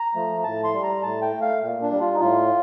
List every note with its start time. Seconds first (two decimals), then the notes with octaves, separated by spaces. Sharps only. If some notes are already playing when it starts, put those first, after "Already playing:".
Already playing: A#5
0.15 F3 A3
0.44 A2 A5
0.64 C6
0.74 G3
0.83 A#5
1.02 A2 A5
1.22 G5
1.32 A3
1.41 F5
1.62 A#2
1.82 D4
1.91 G3
2.00 F4
2.15 D#4
2.20 A2 F4